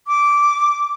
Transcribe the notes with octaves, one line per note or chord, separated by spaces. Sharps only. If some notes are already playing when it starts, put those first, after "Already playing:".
D6